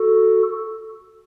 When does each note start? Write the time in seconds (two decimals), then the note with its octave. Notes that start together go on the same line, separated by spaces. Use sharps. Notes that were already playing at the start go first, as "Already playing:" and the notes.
Already playing: F#4 A4